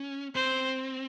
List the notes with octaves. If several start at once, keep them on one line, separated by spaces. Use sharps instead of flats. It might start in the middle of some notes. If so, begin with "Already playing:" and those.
Already playing: C#4
C4 C5